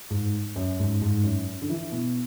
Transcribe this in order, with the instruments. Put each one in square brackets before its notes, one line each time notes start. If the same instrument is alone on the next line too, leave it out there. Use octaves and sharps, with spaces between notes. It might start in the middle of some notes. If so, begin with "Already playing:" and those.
[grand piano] G#2
F#2
G#2
G#2
F#2
D3
E3
B2